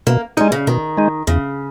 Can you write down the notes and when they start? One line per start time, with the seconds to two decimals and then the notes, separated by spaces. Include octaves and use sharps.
0.07 B2 A#3
0.37 G3 G#3 D#4
0.52 C#3
0.67 B2 D#3
0.97 G#3 D#4
1.27 E2 C#3